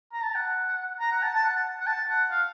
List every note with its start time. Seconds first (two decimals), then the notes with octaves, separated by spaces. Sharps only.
0.13 A#5
0.24 A5
0.35 F#5
1.00 A#5
1.12 F#5
1.22 A5
1.35 A5
1.44 F#5
1.80 F#5
1.87 A5
2.09 F#5
2.31 F5